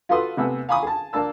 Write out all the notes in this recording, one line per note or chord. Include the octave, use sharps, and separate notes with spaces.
F4 F#4 A4 B4 C6 D#6
C3 A3 B3 G#5 E6
F5 G#5 A#5 B5 C#6 D#6
G#4 A5
A#3 D4 A5 E6